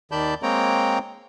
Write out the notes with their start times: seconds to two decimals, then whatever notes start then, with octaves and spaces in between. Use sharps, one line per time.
0.12 D#2 D#3 D5 A5 B5 G6
0.43 G#3 A#3 C4 C#5 G5 A#5